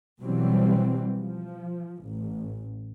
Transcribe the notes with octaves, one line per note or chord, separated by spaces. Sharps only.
B2 E3 F#3 G3 C4
F3
A1